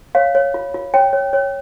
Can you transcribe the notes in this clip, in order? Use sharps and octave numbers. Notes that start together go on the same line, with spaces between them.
C#5 F5
C#5
F4
F4
C#5 G5
C#5
C#5